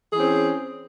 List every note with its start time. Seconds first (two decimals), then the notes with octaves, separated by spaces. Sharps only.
0.11 G#4
0.14 E3
0.17 C#4
0.20 C4